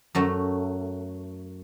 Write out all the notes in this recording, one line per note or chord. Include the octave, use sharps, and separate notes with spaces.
F#2 F#3 A3